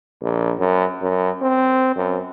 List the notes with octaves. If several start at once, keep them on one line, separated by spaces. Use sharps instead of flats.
A#1
F#2
F#2
C4
F#2